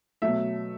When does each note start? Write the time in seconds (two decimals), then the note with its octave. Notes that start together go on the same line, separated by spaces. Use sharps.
0.22 B2 F#3 A3 E5